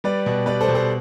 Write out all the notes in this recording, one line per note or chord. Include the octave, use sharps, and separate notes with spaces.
G3 B4 D5
B2
G3 B4 D5
A4 C5
B2
A4 C5